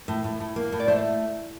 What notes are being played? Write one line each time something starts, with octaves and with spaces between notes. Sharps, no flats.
A2
A2
A2
A#3
A2
D5
A3 C5